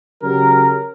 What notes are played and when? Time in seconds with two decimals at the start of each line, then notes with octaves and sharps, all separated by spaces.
0.24 C#3 F#3 G4 A#4